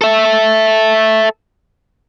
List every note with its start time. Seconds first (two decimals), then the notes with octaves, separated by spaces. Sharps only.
0.01 A4 E5